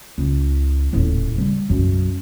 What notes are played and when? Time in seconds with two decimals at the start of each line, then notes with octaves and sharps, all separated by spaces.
0.18 C#2
0.93 D#1 A2
1.36 C#3 G3
1.69 B1 F#2